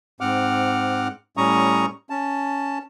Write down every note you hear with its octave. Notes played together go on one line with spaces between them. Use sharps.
G#2 C4 F#5 D6 F6
A2 G3 C#4 A#5 C#6 D#6
C#4 A5